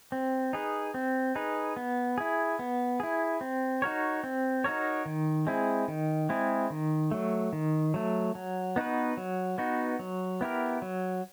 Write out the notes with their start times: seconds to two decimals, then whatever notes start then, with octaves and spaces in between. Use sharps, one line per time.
0.12 C4
0.53 D#4 G#4 B4
0.94 C4
1.35 D#4 G#4 B4
1.77 B3
2.18 E4 G#4
2.59 B3
3.00 E4 G#4
3.41 C4
3.82 D#4 F#4 A#4 C#5
4.24 C4
4.64 D#4 F#4 A#4 C#5
5.06 D#3
5.47 G#3 C4 E4 G#4
5.88 D#3
6.29 G#3 C4 E4 G#4
6.70 D#3
7.11 F#3 A3
7.53 D#3
7.94 F#3 A3
8.35 F#3
8.76 B3 D#4 F#4 B4
9.17 F#3
9.58 B3 D#4 F#4 B4
9.99 F#3
10.41 B3 E4 G4 A#4
10.82 F#3